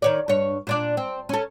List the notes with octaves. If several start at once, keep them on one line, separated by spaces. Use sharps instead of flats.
D#3 C#5 D5
G2 C#5
A#2 D4 D5
C4
C#4 A4